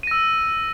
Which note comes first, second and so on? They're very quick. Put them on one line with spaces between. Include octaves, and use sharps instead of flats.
D#7 A#6 E6